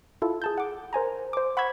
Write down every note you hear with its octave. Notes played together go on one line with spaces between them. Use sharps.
E4 F4 A4
G#4 A5 G6
F#5 D6
A#4 C5 G#5 A#5
C5 D6
F#5 B5 C#6 E6 G#6 B6